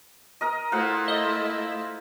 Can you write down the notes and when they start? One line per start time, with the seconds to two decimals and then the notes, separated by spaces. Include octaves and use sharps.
0.41 A#4 D#5
0.72 A3 E4 F4 C5 F#5
1.08 D#5